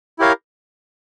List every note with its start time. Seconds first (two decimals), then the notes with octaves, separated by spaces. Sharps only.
0.19 E4 G4 A#4 C#5 F5